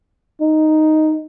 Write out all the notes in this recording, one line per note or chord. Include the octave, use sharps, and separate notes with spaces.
D#4